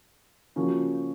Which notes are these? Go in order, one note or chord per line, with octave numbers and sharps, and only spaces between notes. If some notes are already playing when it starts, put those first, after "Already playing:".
C#3 F3 A#3 C#4 F#4